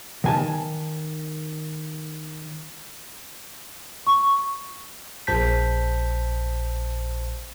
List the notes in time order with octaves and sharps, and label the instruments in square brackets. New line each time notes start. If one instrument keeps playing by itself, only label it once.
[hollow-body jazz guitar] D#3 G#5 A5
[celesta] C#6
[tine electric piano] A#1 C5 A5 G6 B6